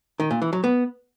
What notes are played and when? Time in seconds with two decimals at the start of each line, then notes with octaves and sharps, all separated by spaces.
0.20 D#3
0.31 A#2
0.42 E3
0.53 F#3
0.64 B3